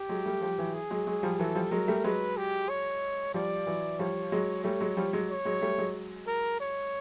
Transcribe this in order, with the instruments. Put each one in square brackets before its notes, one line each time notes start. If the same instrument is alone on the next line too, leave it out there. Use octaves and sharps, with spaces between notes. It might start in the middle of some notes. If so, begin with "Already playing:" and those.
Already playing: [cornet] G4
[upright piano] F#3 G#3
G3 A3
F3 G3
E3 F#3
[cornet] G#4
[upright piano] F#3 G#3
F#3 G#3
F3 G3
[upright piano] E3 F#3 [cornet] A4
[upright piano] F3 G3
[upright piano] F#3 G#3 [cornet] A#4
[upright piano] G3 A3
[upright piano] F#3 G#3 [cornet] B4
[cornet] G4
C#5
[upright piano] F3 G3 [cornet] D5
[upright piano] E3 F#3
[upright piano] F3 G3 [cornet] C#5
[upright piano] F#3 G#3
[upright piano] G3 A3 [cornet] C#5
[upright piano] F#3 G#3
F3 G3
F#3 G#3
[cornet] C#5
[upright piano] F#3 G#3
G3 A3
F#3 G#3
[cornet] A#4
C#5